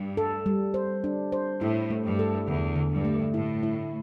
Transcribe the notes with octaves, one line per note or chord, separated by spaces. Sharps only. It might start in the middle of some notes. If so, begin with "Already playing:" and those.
Already playing: G2
A4
G3
C5
D4
C5
A2 E4
A3
G2
A4
E2 D3
D3
G2
A3
A2 E4
E4